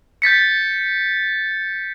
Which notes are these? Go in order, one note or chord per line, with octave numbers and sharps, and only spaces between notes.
G6 A6 B6 C#7